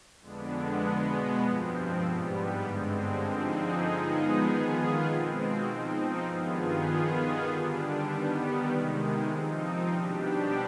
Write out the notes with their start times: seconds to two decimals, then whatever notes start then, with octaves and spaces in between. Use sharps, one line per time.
0.21 F2 D3 G#3 B3 D4
0.81 B2 G#3 B3
1.41 G2 F3 C4
2.02 G#2 G3 B3
2.62 G2 D3 G#3 C4
3.23 D3 F3 C4 D#4 G#4
3.83 F3 G#3 B3 D#4 G#4
4.43 D#3 B3 F4 G#4
5.04 B2 G#3 C4
5.65 F3 C4 D#4
6.25 G2 D#3 B3 F4 G#4
6.85 D#3 B3 F4 G#4
7.46 D3 G3 D4
8.06 D#3 G3 B3
8.67 C3 D#3 G#3
9.28 F3 C4 D#4
9.88 B2 G3 D4 G4